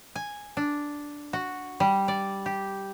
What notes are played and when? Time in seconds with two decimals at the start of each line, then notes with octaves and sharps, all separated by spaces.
0.15 G#5
0.57 D4
1.33 F#4
1.80 G3
2.08 D5
2.46 G4